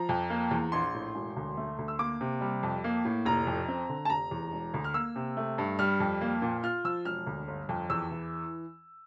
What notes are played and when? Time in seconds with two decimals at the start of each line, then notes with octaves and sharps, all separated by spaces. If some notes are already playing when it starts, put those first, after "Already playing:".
Already playing: F3 A#5
0.09 F2
0.30 A#3
0.51 E2
0.72 A#1 C6
0.94 A2
1.15 E1
1.36 D2
1.57 A3
1.78 D2
1.88 E6
1.99 A#3 D6
2.21 C3
2.41 G3
2.63 F2
2.84 A#3
3.05 A2
3.26 F1 A#5
3.47 F2
3.68 C4
3.89 D3
4.05 A5
4.10 F1 A#5
4.31 E2
4.53 E1
4.74 D2
4.84 F6
4.94 A#3 E6
5.16 C3
5.37 A3
5.58 G2
5.79 G3 F6
6.00 F2
6.21 A#3
6.42 A#2
6.63 F4 F6
6.85 F3 E6
7.05 E1 F6
7.26 D2
7.48 G1
7.69 F2
7.90 E2 E6
8.11 E3